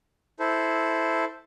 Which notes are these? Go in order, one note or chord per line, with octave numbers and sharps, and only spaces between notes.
E4 A4 C5